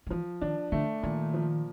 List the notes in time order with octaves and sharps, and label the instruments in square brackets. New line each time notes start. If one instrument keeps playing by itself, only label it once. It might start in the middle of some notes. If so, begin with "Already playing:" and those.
[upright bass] D#3
[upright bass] E3 [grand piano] F3
[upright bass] D#3 [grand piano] D4
[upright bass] D3 [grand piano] A3
[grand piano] A#2 [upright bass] D#3
[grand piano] F3